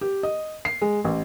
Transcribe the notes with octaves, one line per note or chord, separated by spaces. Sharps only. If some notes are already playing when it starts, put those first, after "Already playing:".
G4
D#5
C7
G#3
A1